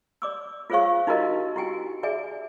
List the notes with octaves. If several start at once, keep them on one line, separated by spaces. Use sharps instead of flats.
D5 D6 E6
F4 G#4 C5 C#5 F5 C#6
D#4 E4 F#4 G4 A#4 D#5
E4 F#4 G4 G5 G#5
G#4 D5 E5 G#5